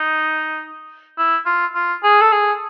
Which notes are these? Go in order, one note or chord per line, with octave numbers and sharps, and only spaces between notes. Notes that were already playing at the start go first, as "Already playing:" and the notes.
Already playing: D#4
E4
F4
F4
G#4
A4
G#4